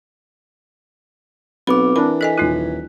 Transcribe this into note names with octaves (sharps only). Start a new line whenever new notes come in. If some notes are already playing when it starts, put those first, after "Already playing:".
B1 C4 B4 B5 D6
E3 D4 A#4 B5
A4 D#5 G#5 B6
D#1 D#4 F4 G#5 F#6